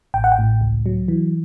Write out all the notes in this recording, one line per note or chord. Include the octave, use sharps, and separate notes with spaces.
A1 G5
F#5
G5
A2
C#2
F#3
E3